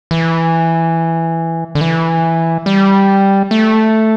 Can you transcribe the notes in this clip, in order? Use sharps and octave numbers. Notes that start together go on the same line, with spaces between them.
E3
D3
E3
G3
A3